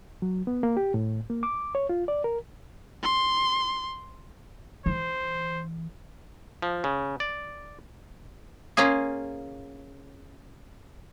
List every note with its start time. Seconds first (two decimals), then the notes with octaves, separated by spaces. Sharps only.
0.22 F#3
0.47 B3
0.63 A#3
0.77 G4
0.94 A2
1.30 A#3
1.43 D6
1.75 C#5
1.89 F4
2.08 D5
2.24 A#4
3.03 C6
4.86 E3 C5
6.62 F3
6.84 C#3
7.20 D5
8.77 A#3 C#4 F4 G#4